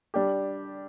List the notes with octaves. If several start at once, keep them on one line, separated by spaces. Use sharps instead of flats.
G3 D4 G4